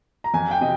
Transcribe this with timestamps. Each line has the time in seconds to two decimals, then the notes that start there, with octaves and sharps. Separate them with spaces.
0.24 A#5
0.34 F2 G#5
0.51 G5
0.61 C3 D#5